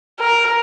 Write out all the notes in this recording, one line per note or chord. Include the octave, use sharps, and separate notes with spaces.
A#4